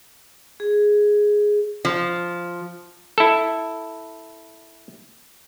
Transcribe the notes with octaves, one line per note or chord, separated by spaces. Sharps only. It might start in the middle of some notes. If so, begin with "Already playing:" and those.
G#4
F3
E4 A4